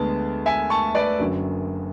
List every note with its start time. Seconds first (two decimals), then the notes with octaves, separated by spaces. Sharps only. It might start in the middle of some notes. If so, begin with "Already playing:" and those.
Already playing: D2 D3 G#3 B3 A5
0.46 E5 G#5
0.70 A5 C#6
0.95 B4 D5
1.19 F#1 F#2 D3 F#3